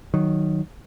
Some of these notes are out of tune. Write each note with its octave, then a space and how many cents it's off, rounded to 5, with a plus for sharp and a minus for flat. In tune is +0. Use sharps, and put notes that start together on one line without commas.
D#3 -5 F#3 +0